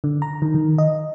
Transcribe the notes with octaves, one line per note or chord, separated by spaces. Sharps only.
D3
A#5
D#3
D#3
D#5